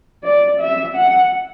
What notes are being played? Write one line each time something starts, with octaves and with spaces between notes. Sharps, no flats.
D5
E5
F#5